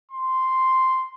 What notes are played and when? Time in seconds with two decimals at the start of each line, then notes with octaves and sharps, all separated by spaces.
0.11 C6